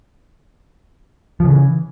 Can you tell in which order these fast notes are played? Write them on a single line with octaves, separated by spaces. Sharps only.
F3 C#3 E3